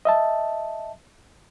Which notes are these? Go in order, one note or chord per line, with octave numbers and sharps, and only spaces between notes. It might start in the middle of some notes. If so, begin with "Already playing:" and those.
D#5 E5 A5